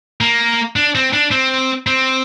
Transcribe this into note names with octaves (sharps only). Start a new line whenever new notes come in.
A#3
D4
C4
D4
C4
C4